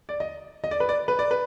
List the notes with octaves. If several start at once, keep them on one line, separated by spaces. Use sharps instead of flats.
D5
D#5
D#5
D5
B4
D5
B4
D5
B4